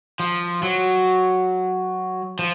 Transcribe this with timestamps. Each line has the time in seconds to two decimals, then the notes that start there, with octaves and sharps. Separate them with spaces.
0.20 F3
0.63 F#3
2.39 F3